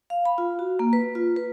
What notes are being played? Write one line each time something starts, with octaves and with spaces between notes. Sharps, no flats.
F5
B5
F4
F#4
A#3
B4
F4
B4